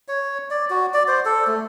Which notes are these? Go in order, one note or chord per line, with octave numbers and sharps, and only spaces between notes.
C#5
D5
F#4
D5
C5
A4
A3